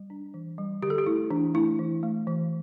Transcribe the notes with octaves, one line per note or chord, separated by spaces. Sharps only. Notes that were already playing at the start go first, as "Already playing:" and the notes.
Already playing: G3
D4
E3
G3
D3 G4
A4
G4
A3 E4
E3 D4
A3 E4
E3
A3
E3